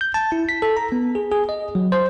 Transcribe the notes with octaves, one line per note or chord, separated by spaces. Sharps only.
G6
A5
E4
B6
A4
A#5
B3
G#4
G#4
D#5
F#3
C5